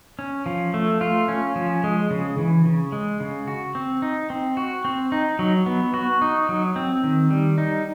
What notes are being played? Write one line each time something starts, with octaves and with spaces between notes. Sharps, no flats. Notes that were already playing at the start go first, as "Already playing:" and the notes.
C#4
F3
A3
F4
C#4
F3
G#3
C#3
E3
C#3
G#3
C#3
F#4
C4
D#4
C4
F#4
C4
D#4
F#3
B3
F#4
D#4
F#3
C4
D#3
G3
D#4